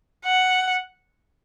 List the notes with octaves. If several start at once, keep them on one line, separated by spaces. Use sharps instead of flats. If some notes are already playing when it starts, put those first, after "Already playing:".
F#5